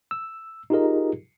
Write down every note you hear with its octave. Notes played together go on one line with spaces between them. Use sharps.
E6
D#4 F4 G4 G#4 A#4 D#5